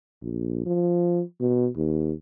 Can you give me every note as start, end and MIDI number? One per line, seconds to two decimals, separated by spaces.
0.22 0.66 34
0.66 1.22 53
1.40 1.68 47
1.77 2.12 39